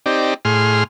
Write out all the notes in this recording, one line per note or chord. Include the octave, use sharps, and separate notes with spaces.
C4 D#4 G4 D5
A2 G#4 C6 F6